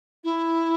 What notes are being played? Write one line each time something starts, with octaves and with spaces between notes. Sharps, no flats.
E4